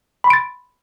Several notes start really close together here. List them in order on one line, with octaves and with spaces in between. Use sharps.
B5 C6 D7 A6